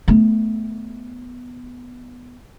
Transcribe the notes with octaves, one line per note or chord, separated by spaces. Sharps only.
A3 B3